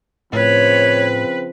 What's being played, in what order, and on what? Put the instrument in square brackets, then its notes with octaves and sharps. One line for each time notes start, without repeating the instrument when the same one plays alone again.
[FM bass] A2 [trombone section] C#3 F3 C4 [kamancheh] B4 [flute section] C#5